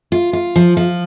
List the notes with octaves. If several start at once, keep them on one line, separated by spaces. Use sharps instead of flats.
F4
F4
F3
F3